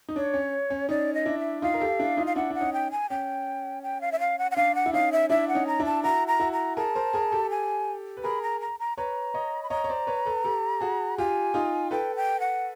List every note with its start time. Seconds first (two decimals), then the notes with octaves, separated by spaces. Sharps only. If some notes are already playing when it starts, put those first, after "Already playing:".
0.09 D#4
0.16 D4 C#5
0.34 C#4
0.70 C#4
0.89 C#4 D#4 D5
1.14 D#5
1.25 D4 E4
1.39 E5
1.62 D#4 F4 F5
1.74 A#4
1.80 G4 A4
1.99 D4 E4
2.17 D#4 F4
2.27 F5
2.36 D4 E4 F#5
2.50 D4 F#5
2.60 C#4 D#4
2.73 G5
2.91 G#5
3.10 C#4 G5
3.83 G5
4.01 F5
4.12 E5
4.20 F5
4.39 F#5
4.51 F#5
4.56 D4 F5
4.75 F#5
4.86 E4
4.93 C#4 D#4 F5
5.12 E5
5.30 D4 E4 E5
5.48 F#5
5.55 C#4 D#4
5.67 A#5
5.80 D4 E4
5.85 A5
6.03 E4 F#4 A#5
6.28 A#5
6.40 E4 F#4
6.53 A#5
6.77 G#4 A#4 A5
6.95 A#4 C5
7.14 G#4 A#4
7.32 G4 A4
7.50 G#5
8.17 B4
8.23 G#4 A#4 B5
8.42 A#5
8.61 A#5
8.80 A#5
8.98 B4 C#5 A#5
9.34 C#5 D#5
9.63 B5
9.70 C#5 D#5 A#5
9.84 C#5
9.90 C5 D5
10.07 B4 C#5
10.26 A4 B4
10.44 G4 A4
10.81 F#4 G#4
11.18 F4 G4 G#5
11.54 D#4 F4
11.91 A4 B4 G5
12.16 G5
12.40 F#5